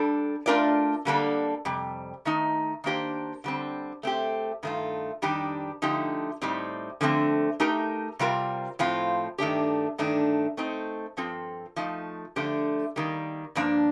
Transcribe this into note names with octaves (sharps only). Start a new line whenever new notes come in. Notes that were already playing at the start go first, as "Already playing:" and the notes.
Already playing: G3 D4 A4
A3 D4 F4 A#4 D5
D3 G3 A#3 D4 A4
F2 C3 G3
D#3 A3 D#4
D#3 A#3 D4 G4 C5
D3 G3 C4
A3 C4 G4
G2 D#3 A3 D4 F4
F2 D#3 G3 D4 G4
D3 F3 A3 D#4 G4
A2 G3 C4 D#4
D3 F3 A3 C4
A3 D#4 G4 A#4
C3 G3 C4 F4 A#4
A2 F3 C4 F4
G2 D#3 A3 D4 G4
G2 D#3 A3 D4
A3 C4 D#4
G2 F3 C4 F4 A4
F3 A3 D#4
D3 F3 A3 D4 G4
D#3 G3 A#3
G2 F3 A#3 D4